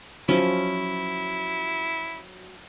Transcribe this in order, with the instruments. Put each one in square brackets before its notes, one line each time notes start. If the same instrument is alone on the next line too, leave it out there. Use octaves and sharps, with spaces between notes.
[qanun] F3 C#4 [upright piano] F#3 [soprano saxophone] E4